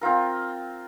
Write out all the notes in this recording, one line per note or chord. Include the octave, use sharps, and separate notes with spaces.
C4 F4 A#4